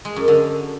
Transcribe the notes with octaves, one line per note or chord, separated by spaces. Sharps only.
G#3
F#2
D3